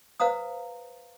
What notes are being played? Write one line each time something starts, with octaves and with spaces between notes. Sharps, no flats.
B4 C5 F5 A#5 D#6